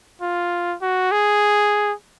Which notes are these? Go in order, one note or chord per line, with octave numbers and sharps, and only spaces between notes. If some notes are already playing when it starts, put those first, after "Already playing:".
F4
F#4
G#4